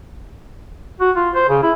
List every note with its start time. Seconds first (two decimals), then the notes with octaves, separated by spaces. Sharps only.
1.01 F#4
1.16 F4
1.35 C5
1.49 C#3
1.62 E4